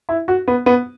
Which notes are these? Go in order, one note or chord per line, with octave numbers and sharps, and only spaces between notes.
E4
F#4
B3
B3